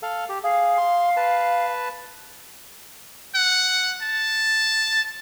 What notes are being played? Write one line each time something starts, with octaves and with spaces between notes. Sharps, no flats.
A4 F5
G4
G#4 F5
C6
B4 A5
F#5
A5